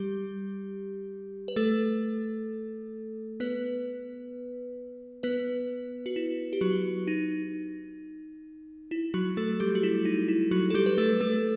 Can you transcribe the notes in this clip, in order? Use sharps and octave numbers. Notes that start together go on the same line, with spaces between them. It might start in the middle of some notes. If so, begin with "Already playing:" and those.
Already playing: G3 G4
B4
A3 A4
B3 B4
B3 B4
F#4
E4
G4
F#3 F#4
D#4
E4
F#3 F#4
A3 A4
G3 G4
F#4
E4
D#4
E4
F#3 F#4
A4
G3 G4
B4
A3 A4
A3 A4